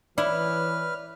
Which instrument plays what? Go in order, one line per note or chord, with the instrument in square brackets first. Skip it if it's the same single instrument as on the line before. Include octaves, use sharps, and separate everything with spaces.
[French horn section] E3 C#5 [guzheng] E4 [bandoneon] B4 F6 [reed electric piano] D5